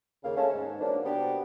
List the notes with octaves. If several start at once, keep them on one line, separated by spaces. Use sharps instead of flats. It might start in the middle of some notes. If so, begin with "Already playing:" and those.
D#2 C#3 A#3 F5
G#3 A3 C#4 C#5 A5
G#2
E3 F#3 A#3 C#4 D4
C3 B3 D4 F#4 G4 B4